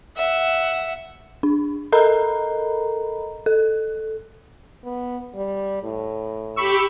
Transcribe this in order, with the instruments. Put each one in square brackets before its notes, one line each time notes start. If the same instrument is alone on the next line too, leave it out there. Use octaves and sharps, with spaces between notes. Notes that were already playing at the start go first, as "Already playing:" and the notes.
[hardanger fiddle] E5 F#5
[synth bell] D4
A4 A#4 D#5 A#5 B5
A4
[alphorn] B3
G3
A2
[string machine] G4 [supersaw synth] B5 C#6 E6